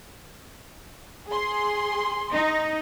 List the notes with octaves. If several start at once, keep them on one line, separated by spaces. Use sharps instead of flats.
G#4 C6
D#4